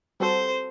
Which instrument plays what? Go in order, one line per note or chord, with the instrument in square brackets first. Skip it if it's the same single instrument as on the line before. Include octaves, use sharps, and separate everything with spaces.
[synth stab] G3 C4 F#4 A4 [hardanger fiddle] C5